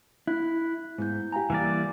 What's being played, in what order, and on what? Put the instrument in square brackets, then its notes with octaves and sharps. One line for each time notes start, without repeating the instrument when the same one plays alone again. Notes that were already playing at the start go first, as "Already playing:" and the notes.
[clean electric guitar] E4 [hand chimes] F#6
[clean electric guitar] G#2 [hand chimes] B3 E4 G6
[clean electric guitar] G4 A#5 [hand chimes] F5 G5 G#5
[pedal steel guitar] E3 A#3 D5 [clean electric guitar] G3 [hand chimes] A#4